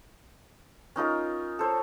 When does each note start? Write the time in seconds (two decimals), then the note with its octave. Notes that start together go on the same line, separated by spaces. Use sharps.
0.96 C#4 D#4 F4 A#4
1.59 A4 C5 C#5